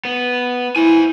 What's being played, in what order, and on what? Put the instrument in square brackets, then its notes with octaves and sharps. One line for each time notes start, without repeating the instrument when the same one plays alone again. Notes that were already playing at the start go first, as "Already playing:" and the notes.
[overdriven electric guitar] B3
[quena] E4 [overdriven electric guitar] C5 G#5